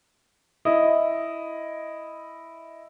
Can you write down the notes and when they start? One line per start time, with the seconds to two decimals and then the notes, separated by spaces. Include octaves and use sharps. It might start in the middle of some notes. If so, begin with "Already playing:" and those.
0.65 E4 D#5